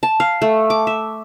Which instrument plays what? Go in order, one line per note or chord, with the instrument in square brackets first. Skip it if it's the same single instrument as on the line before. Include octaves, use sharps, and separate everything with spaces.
[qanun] A5
F5
A3
D6
E5